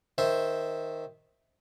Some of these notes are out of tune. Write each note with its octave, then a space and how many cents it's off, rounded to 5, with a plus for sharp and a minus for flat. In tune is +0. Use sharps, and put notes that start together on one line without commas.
D#3 +10 C5 +0 E5 +0